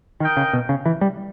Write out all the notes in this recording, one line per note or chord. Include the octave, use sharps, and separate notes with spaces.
D#3 D#4 A#4 D#5 G5
C#3
B2
C#3
E3
G3